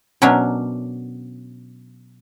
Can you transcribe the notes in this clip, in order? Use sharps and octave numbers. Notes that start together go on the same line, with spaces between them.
B2 F#3 C#4 D4 A#4